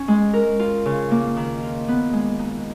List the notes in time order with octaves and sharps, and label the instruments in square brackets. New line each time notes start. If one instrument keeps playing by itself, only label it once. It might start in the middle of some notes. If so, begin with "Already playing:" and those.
Already playing: [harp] C#4
G#3
A#4
F4
C#3
A#3
D#3
F4
B3
G#3
D#4